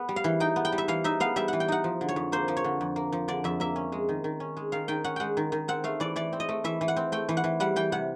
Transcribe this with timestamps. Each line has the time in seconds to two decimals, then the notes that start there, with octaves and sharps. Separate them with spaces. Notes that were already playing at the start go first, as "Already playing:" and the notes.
Already playing: B3
0.09 G3
0.16 F5
0.24 E3
0.40 D#4 G5
0.56 B3
0.65 G5
0.72 G3
0.78 E5
0.88 E3 F5
1.04 D#4 E5
1.20 B3 F5
1.36 G3 E5
1.48 E3 F#5
1.60 G5
1.68 D#4 F#5
1.84 F3
2.01 D3
2.09 C#5
2.16 F2
2.32 A#3 C5
2.48 F3
2.57 C#5
2.64 D3
2.81 F2
2.96 A#3
3.12 F3
3.28 D3 D5
3.44 F2 E5
3.60 A#3 E5
3.76 C#4
3.92 G#3
4.09 D#3
4.24 D#3
4.40 C#4
4.57 G#3
4.72 D#3 F5
4.88 D#3 G5
5.04 C#4 F#5
5.16 G#3 F#5 G5
5.37 D#3
5.52 D#3
5.68 C4 F#5
5.84 A3 F5
6.00 E3 D5
6.16 E3 D5
6.33 C4
6.40 D#5
6.49 A3
6.64 E3 E5
6.81 E3
6.88 F#5
6.96 C4
7.12 A3 G5
7.29 E3
7.37 F#5
7.44 E3
7.60 G3 F#5
7.76 E3 G5
7.92 C3 F#5